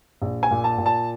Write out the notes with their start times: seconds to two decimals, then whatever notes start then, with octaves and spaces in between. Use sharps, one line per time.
0.22 A#1
0.43 G#5
0.51 A#2
0.64 A5
0.78 A#2
0.86 A5